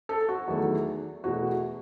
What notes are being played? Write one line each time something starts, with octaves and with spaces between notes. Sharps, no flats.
A4
F#4
E2 D#3 F#3 A3
E2 B2 A3 F#4